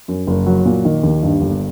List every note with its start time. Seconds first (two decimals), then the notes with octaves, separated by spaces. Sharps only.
0.08 F#2
0.27 F#1
0.46 F#3
0.65 A#2
0.85 D#3
1.03 D#2
1.23 G2
1.42 G1